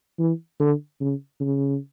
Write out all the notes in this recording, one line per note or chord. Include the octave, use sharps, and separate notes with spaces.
E3
D3
C#3
C#3